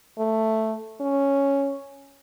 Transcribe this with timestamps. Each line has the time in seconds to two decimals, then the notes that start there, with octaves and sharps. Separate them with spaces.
0.18 A3
1.01 C#4